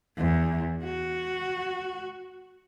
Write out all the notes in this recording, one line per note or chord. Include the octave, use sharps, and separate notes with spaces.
E2
F#4